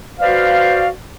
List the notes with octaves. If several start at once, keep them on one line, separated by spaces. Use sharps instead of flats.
F#4 B4 C5 D5 F5